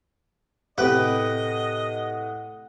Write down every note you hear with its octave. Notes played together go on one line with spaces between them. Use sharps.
A2 C3 G4 B4 D#5 F#5